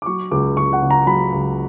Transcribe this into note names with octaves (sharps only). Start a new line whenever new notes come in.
D6
F#3 C#6
C#2 D6
C#2 C#6
F#5
C#3
A#5
F#3 B5
C#2